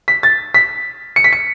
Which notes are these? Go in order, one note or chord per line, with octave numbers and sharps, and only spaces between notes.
B6
A6
B6
C#7
B6
C#7